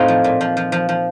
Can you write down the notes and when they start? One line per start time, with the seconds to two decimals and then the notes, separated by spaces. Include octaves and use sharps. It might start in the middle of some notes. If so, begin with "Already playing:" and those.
Already playing: A2 C4 D#4 F4
0.08 F3
0.24 A#2
0.41 F3
0.57 F3
0.72 F3
0.89 F3